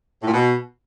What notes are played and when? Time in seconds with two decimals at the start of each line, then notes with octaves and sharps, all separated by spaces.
0.22 A2
0.27 A#2
0.33 B2